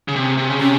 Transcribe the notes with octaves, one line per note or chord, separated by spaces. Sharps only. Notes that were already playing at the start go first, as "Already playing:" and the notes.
C#3
C3
C3
C#3
C3 C#4